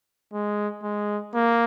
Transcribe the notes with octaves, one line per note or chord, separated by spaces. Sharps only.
G#3
G#3
A#3